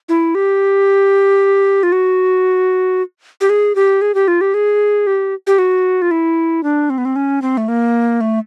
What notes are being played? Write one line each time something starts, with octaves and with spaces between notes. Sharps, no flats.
E4
G4
F4
F#4
G4
G#4
G4
G#4
G4
F4
G4
G#4
G4
G4
F#4
F4
E4
D4
C4
B3
C4
C#4
C4
A3
A#3
A3